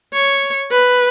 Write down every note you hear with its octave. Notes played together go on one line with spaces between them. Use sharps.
C#5
B4